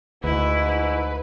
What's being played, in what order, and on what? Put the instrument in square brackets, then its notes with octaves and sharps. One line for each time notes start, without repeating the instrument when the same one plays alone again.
[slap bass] D2 [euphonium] G#2 [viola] E4 [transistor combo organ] B4